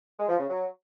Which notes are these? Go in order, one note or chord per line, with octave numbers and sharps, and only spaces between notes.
G#3
F3
C#3
F#3